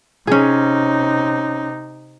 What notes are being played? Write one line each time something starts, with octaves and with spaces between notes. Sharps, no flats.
C3 C#4 D#4 G#4